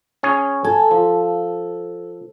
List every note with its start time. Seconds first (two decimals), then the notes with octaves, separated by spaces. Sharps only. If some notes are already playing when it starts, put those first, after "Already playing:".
0.23 C#4 G#4 C#5
0.64 A4 G#5
0.91 F3